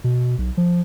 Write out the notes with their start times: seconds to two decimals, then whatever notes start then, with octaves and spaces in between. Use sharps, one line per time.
0.04 B2
0.38 B1
0.57 F3